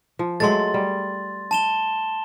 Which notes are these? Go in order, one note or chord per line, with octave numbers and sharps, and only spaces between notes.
F3
F#3 G#3 A3 C6 A6
G3
A5 E7 G7